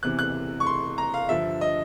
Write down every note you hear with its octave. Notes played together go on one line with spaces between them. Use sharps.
E2 C3 E3 F#6
F#6
C#6
C6
A#5
F5
G2 D3 F3 E5
D#5